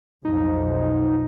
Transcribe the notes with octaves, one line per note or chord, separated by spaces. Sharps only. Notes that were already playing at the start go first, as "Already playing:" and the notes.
B1 F2 F3 D#4